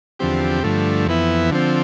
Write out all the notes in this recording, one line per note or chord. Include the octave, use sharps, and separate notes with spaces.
E2 D3 F3 C4 G4
G2 D3 F3 A3
F2 E3 B3 E4
D3 F3 C4